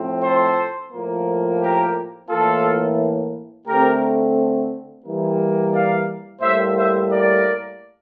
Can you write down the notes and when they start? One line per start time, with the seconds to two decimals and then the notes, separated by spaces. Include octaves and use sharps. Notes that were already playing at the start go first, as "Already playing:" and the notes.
Already playing: A2 F3 C4
0.23 A4 C5
0.93 A2 F3 A#3
1.61 G4 A#4
2.30 A2 E3 A#3 F4 A4
3.66 D3 A3 C4 G4 A#4
5.04 E3 G3 A#3
5.73 D5 F5
6.42 A2 G3 A#3 C5 E5
6.76 C5 E5
7.10 A#4 D5